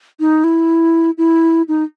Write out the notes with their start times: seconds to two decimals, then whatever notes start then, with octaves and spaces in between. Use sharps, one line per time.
0.20 D#4
0.44 E4
1.18 E4
1.68 D#4